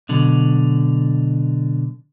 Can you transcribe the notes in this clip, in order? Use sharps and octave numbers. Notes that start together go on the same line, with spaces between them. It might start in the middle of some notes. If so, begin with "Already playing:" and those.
B2 D3 F#3